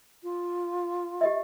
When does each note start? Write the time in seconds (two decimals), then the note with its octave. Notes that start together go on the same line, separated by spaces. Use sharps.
0.23 F4
1.21 G4 D#5 E5